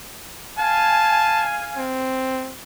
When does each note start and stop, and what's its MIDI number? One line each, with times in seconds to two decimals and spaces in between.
0.58 1.86 77
0.58 1.86 80
0.58 1.45 81
1.76 2.54 60